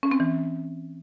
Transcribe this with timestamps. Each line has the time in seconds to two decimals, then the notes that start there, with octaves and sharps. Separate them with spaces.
0.03 C#4
0.11 C4
0.20 E3